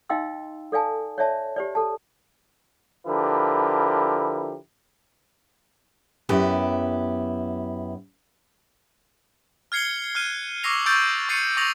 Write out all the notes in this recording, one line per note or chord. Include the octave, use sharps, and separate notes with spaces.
D#4 D#5 F5 G5 C6 E6
A4 D5 F5 G#5 A5
C#5 D5 E5 A5
G4 C5 D5
A4 A5
D3 F3 E4 G4 A#4 B4
F#2 B3 E4 G4
F6 G#6 C7 C#7 G7
F6 F#6 D#7
C#6 D6 E6 A#6 C7 F7
C#6 D#6 E6 G6 A6 D7
C#6 A6 C7 C#7 D#7
C#6 D#6 A6 A#6 F7 F#7